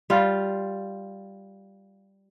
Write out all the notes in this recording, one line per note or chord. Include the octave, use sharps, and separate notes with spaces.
G3 F4